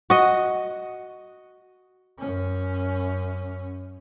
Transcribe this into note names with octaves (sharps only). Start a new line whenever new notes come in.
F#4 D#5
F#2 C#4